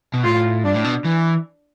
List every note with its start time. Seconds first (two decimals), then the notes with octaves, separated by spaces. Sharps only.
0.14 B2
0.24 A2 F4
0.64 G2 D4
0.74 A2
0.84 B2
1.05 E3